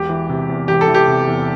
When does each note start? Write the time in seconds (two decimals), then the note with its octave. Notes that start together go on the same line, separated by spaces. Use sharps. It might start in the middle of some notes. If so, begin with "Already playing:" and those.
Already playing: E1 G4
0.09 E3
0.29 C3
0.49 E2
0.68 E1 G4
0.81 A4
0.87 E3
0.94 G4
1.08 C3
1.27 E2